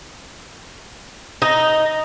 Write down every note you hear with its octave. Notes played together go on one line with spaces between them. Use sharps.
D#4